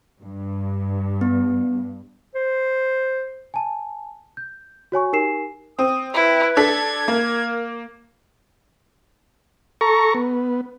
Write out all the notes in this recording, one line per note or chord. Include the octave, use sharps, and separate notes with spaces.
G2
B3
C5
G#5 A5
G6
F#4 C#5 G#5 C#6
D#4 G4 A#4 G#5 C7 E7
C4 D#6
E4 B4
D4 A4 G#6 B6
A#3 A#4
A4 A#5 C#6
B3